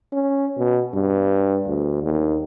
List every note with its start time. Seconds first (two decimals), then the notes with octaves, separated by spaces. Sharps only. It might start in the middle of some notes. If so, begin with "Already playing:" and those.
0.12 C#4
0.58 B2
0.93 G2
1.67 D2
2.02 D#2